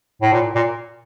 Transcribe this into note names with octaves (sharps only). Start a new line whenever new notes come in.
A2
A#2
A#2